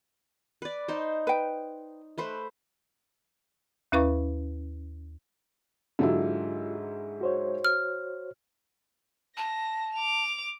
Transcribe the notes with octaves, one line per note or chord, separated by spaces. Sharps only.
B4 D5
D#4 C5
B4 G5
A3 B4 C5
D#2 C#4 E4 B4 F5 C#6
G#2 D3 F#3 E4 F4 G4
F#4 C5 C#5
F6
A5 A#6
D6 F7